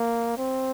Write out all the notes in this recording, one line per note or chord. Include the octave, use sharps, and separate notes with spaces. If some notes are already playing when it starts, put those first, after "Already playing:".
Already playing: A#3
C4